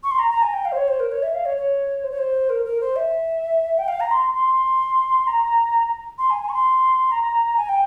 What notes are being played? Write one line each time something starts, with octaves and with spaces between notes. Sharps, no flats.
C#6
C6
A#5
A#5
G#5
G5
F5
C5
C#5
C5
A#4
C#5
E5
F5
C#5
C#5
C5
C#5
C5
A#4
A#4
C5
E5
G5
F5
A#5
C6
C6
A#5
C6
G#5
G#5
C#6
C6
A#5
G#5
G5